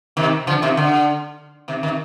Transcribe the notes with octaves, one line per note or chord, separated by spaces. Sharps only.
C3 D#3
D3 F3
C3 D#3
D3
C3 D#3
C3 D#3